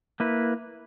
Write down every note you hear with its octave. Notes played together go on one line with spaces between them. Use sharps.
A#3 E4 B4